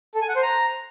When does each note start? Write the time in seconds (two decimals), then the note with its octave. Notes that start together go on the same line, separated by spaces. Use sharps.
0.15 A4
0.22 G#5
0.29 F#5
0.36 C5
0.43 A#5